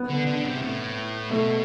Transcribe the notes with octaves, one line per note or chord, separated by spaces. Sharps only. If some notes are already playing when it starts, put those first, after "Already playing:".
Already playing: B3
D3
D3
C3
A2
B2 A3